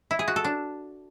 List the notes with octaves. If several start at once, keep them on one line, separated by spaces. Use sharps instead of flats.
E4
G#4
F#4
A4
D4